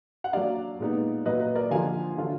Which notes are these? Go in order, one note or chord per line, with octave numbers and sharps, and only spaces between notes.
F#5
F#3 A#3 D4 D5 F5
A#2 G#3 B3 D#4
A#2 F#3 A#3 B4 D#5
B4
A#4 D5
D3 F3 A#3 F4 F5 G#5
D3 F#3 D4 F4